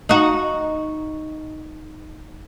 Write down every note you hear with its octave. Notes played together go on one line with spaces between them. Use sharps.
D#4 F#4